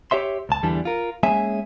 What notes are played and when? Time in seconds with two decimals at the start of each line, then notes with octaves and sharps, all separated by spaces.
0.11 G4 C#5 E5 C6
0.49 C#2 A5
0.63 E2 D3 E3 G3 D4
0.85 F4 A#4
1.23 G#3 A#3 C#4 G#4 E5 G#5